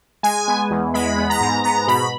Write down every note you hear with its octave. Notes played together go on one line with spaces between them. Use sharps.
G#3 G#5
B3
E2
G#3 B5
B3
A#5
G#2
B3 A#5
B2 B5